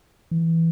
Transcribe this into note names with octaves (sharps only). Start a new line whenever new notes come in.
E3